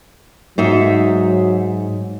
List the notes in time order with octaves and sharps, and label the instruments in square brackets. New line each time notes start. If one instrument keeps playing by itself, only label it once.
[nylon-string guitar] G#2 D#4 E5 [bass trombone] F#3